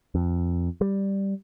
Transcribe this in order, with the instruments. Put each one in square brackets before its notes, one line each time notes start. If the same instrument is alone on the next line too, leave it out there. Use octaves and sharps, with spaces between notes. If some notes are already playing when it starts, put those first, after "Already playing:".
[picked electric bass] F2
G3